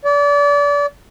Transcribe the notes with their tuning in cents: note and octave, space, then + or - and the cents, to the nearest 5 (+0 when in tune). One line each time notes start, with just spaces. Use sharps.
D5 -30